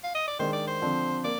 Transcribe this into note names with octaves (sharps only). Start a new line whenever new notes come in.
F5
D#5
D5
D#3 G#3 D4 C5
D5
C5
D3 F3 C4
A#3 D5